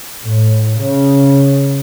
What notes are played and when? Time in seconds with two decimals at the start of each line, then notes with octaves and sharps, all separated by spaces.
0.21 A2
0.82 C#3